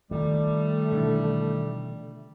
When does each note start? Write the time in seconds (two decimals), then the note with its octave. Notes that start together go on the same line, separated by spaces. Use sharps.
0.11 D#3 F3 G3 A3
0.92 B2 D3 E3